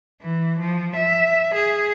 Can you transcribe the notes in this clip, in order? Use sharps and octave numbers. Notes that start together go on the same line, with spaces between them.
E3
F3
E5
G#4